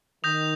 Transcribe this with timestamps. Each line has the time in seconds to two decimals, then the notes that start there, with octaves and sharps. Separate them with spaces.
0.24 D#3 D#6 G6 A#6 F7